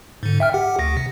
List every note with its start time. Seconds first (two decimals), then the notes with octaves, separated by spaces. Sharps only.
0.23 G#2 D3
0.40 E5 G5 F6
0.53 G4 F#5
0.79 D2 A#6
0.97 C3